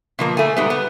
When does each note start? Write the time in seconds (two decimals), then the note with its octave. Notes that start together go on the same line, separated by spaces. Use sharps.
0.19 B2 F3 A#3
0.37 A3 G#5
0.57 G#2 G3 B3
0.70 B3